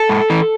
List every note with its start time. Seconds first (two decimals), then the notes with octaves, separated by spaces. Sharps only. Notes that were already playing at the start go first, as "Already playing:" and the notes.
Already playing: A4
0.09 G#2
0.30 E3